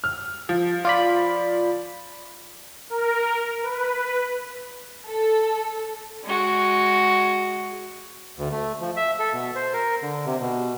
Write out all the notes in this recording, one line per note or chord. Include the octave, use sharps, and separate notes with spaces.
F6
F3
F4 D5 B5
A#4
B4
A4
G#3 F#4
D2
A3
F3
E5
A4
B2
C5
A#4
D3
C3
B2